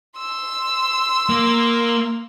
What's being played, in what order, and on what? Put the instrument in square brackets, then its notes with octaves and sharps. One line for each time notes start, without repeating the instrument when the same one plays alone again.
[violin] C6 E6
[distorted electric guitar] A#3